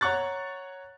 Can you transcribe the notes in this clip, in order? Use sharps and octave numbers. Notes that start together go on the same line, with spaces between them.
C#5 F#5 A#5 C#6 F#6 A6